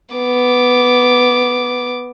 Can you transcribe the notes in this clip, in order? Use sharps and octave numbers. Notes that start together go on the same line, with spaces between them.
B3 D6